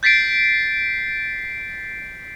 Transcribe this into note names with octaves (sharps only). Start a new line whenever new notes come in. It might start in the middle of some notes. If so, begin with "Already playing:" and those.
G6 A6 B6 C7 D7